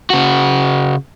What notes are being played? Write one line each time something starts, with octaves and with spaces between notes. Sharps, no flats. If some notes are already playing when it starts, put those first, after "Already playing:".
C#3 F#4